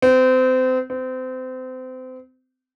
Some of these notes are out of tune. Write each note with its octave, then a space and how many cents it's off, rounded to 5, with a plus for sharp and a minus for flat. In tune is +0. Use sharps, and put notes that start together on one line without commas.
C4 -30
C4 -30